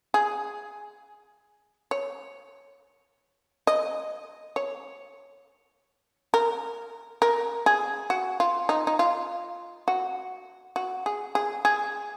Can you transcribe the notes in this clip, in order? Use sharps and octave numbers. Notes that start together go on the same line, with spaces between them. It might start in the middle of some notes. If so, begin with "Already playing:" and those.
G#4
C#5
D#5
C#5
A#4
A#4
G#4
F#4
F4
D#4
D#4
F4
F#4
F#4
G#4
G#4
G#4